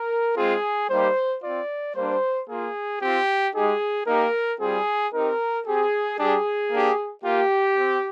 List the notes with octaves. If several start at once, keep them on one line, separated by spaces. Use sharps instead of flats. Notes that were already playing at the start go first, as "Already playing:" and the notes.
Already playing: A#4
G#3 C4 F4 G#4
G3 A#3 D#4 G4 C5
C4 F4 D5
G3 A#3 D4 C5
A#3 F4 G#4
C4 F4 G4
G#3 D#4 G4 G#4
A#3 D#4 G4 A#4
G3 C4 F4 G#4
C4 D#4 G4 A#4
C4 G4 G#4
G3 D4 G4 G#4
A#3 D4 G4
A#3 F4 G4
C4